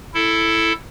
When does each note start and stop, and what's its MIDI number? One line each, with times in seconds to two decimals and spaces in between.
0.14 0.73 64
0.14 0.73 69